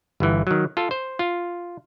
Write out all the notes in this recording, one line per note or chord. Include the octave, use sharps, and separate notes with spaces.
G1 E3
D#3 F#3
F4 A4
C5
F4